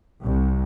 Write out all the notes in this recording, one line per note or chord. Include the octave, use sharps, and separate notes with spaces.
C2